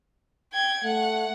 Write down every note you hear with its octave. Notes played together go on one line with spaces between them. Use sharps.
G5 G#6
A3 F#5